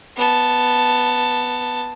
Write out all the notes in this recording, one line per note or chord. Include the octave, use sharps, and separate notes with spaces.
B3 A5